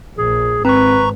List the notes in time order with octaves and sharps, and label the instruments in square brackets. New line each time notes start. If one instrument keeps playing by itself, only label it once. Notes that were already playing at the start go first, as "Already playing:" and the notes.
[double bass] A#1 [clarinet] G#4
[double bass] G#1 [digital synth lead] C4 [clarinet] B4 [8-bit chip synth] A#5 C#6